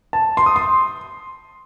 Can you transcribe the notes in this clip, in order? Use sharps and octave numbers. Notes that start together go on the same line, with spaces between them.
A5
C6
D#6
C6